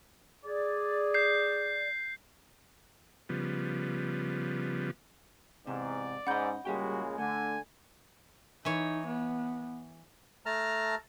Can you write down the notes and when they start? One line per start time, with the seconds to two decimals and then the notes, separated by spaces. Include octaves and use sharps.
0.45 G#4 D5
1.14 G6 C7
3.29 C#3 F3 G3 B3
5.67 E2 G#2 C3 D5
6.27 G#2 C#4 D#5 F#5 B5 G6
6.65 A#2 C#3 G3 G#3 F#4 G4 G5
7.18 D3 A3 G#5
8.65 E3 D#4 C#5
9.07 B3
10.46 A3 A5 A#5 F6